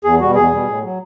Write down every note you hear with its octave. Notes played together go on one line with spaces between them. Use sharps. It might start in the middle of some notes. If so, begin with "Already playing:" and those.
E2 G#4
B2 G3 F#4
E2 G#4
B2 G3
A2
F#3